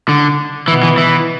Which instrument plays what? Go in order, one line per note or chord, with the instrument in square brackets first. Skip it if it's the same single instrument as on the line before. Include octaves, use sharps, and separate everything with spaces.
[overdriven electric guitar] D3
[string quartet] B2 [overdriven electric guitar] E3
[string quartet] B3 E4
[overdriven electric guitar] E3
E3